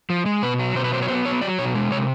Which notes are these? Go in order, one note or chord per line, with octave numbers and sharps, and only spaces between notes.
F3
G#3
B2 B4
F#3
B2 C5
B4
F#3 C5
C#5
B3 C5
F#3 C#5
F#3 D5
B2 C#5
G#3
C3 C#5